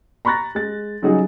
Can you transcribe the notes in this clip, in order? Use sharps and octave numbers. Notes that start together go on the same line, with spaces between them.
A#5 B5 C#6 F#6 A6 A#6
G#3 A6
C#3 F#3 G3 D#4 F#4 G#4